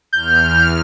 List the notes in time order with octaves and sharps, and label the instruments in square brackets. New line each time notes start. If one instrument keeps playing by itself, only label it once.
[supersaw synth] E2 F6 [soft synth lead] G6